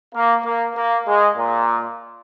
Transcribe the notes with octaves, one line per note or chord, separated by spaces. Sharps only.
A#3
A#3
A#3
G#3
A#2